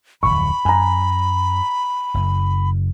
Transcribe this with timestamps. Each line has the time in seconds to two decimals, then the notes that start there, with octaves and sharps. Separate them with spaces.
0.23 D1 G#1 F2 B5 C#6
0.65 F#2 G#5 A#5
2.14 F#1 F#2